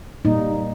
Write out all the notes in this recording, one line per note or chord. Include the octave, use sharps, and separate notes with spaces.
A#2 G3 A#3 D#4